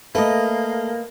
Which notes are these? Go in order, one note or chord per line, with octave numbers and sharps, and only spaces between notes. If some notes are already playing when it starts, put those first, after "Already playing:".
A3 A#3 B4 D#5